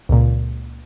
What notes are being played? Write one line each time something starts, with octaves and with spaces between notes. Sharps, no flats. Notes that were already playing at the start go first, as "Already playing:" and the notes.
C#2 A#2